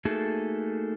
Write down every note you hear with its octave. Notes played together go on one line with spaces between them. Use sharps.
A3 A#3 D#4 F#4 G#4 A4